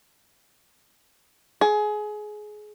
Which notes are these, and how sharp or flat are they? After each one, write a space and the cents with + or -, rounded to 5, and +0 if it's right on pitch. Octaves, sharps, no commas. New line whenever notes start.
G#4 +20